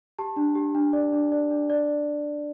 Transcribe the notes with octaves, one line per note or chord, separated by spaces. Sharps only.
G4 A5
D4
G4
D4
D5
D4
D5
D4
D5